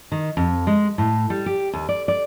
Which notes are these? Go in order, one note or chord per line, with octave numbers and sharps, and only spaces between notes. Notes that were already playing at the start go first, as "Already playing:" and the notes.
D#3
F2
G#3
A2
G3
G4
D#2
D5
D5